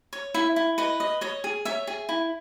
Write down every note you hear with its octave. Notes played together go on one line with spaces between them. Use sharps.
C#5
E4 E5
E4
B4 D#5
D#5
C#5 D#5
G#4
C#5 E5
G#4
E4